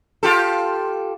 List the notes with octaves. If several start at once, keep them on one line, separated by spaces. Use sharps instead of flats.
F4 G4 A4